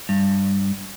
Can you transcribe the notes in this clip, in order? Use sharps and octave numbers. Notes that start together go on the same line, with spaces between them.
G2